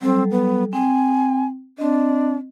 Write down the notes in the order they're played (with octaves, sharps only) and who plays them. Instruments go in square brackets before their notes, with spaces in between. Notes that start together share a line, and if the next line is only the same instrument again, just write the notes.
[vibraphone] F#3 G3 A4 [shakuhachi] C4
[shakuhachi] B3
[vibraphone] C4 G5 [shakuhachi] G#5
[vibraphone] C4 D#5 [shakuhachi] D4